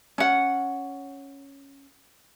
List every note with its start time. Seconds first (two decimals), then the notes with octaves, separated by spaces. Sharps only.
0.18 C#4 F#5